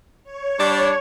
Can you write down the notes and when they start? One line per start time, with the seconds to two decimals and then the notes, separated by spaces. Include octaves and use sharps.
0.23 C#5
0.60 G3 D4